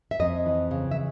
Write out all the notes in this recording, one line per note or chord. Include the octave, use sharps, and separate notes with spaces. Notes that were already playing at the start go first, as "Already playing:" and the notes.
E5
F2 D#5
E3
C#3
E5